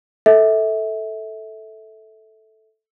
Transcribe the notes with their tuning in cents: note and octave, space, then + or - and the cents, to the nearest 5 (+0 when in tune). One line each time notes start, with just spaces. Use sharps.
A4 +0 E5 -25